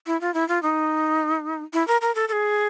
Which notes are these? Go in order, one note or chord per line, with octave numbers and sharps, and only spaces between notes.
E4
F4
E4
F4
D#4
E4
A#4
A#4
A4
A4
G#4